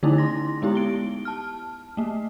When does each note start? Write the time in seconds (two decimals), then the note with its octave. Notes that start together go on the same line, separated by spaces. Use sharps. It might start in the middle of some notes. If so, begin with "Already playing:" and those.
0.03 D3 A3 C#4 D#4 E4
0.18 C6 A#6
0.62 G#3 B3 D#4 E4 G4
0.75 D7 G7
1.25 A5 F6
1.97 A3 A#3